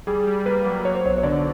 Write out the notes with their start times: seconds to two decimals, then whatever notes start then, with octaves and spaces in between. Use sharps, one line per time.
0.07 G3 G#4
0.27 G3
0.46 A#3 B4
0.66 F#3
0.85 F#3 C#5
0.95 C5
1.04 B1 C#5
1.18 C#5
1.23 D3 D5